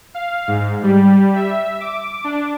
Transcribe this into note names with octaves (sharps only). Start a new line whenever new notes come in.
F5
G#2
G3
E5
D6
D4